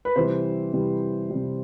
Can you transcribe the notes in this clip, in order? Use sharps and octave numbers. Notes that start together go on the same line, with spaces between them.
B4
C3 E3 G3 C5
C3 E3 G3
C3 E3 G3